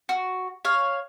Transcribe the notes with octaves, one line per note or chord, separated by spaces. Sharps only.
F#4
C#5 F5